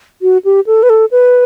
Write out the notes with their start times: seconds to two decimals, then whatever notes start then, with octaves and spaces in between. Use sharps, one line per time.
0.22 F#4
0.45 G4
0.67 A4
0.83 B4
0.90 A4
1.11 B4